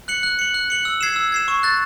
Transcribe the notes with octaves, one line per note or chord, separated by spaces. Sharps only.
F#6 C#7 F#7
F#6
C#7 F#7
F#6
C#7 F#7
E6
G#6 C7 E7
E6
G#6 C7 E7
C#6
F#6 A6